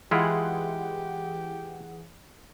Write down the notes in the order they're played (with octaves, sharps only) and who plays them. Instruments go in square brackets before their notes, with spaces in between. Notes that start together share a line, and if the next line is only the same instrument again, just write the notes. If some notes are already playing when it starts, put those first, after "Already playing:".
[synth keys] E3 G#4 F#5 [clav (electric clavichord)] G#3 E4 F4 [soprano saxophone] G4